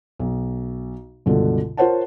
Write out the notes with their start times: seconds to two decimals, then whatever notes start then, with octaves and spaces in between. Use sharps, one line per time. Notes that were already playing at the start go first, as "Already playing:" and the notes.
0.19 B1
1.26 C#2 G2 B2 D3
1.77 F4 A#4 C5 C#5 F#5 A5